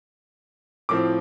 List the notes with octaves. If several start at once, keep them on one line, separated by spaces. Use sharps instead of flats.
A2 F3 C4 D6